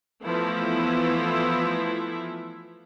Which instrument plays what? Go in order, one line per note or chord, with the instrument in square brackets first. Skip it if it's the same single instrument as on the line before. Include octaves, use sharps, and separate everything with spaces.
[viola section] E3 F3 A3 B3 E4